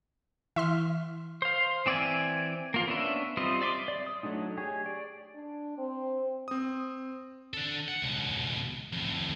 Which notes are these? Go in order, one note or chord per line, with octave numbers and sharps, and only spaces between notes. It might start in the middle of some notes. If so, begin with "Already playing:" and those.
E3 E5 C6 F6
C5 F5
E3 C4 D5 E5 G#5
A#3 F4
B3 C#4 D4 E5
G3 C4 F4 D#5
D5 E5 C6 D6
D5
D#6
F#3 A3 D4 D#4
G4 G#4 C#5
D5
D4
C4
C4 D#6
D4 A4
F#5
C#2 B2
F2 A2